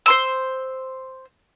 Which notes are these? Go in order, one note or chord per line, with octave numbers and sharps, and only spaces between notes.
C5 C6 E6